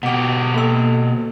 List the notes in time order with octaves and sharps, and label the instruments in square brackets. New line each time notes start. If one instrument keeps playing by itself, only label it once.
[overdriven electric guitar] B2 G4 [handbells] F#5 D6
[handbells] A#3 A4 E6